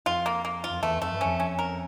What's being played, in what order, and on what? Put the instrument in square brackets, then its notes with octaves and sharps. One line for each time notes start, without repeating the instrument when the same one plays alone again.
[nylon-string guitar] F2 [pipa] F4
[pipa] A#3
A#3
F4
[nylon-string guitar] F2
[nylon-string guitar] E2 [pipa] A3
[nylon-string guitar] F2 [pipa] A3
[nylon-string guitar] G2
[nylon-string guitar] F2 [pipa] C#4
[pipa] C#4
A#4